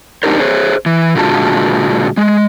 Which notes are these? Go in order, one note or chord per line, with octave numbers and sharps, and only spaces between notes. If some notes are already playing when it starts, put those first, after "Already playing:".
C4 D4 D#4 G4 A#4 C5
G#4 C5 C#5
E3
A#2 D3 G#3 F4 F#4 A5
G#3